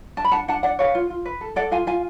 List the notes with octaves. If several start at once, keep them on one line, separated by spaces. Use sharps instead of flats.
D4 A5
B5
D4 F#5 A5
D4 F#5 A5
D4 D5 F#5
B4 C#5 F5
F4
F4
B4
A4
A4 D5 F#5
F4 F5 G#5
F4 F5 G#5